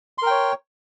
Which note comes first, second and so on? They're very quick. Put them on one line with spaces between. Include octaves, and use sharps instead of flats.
C6 A#4 G5 C#5